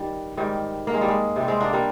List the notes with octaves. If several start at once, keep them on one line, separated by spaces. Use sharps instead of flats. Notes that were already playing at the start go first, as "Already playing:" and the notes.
Already playing: D#3 G3
G#2 D#3 G3
A#3
G#3
G3
G#3
C3 G3
G#3 C4
A#3 D4
G3 A#3